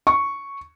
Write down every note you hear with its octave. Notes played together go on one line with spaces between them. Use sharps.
C#6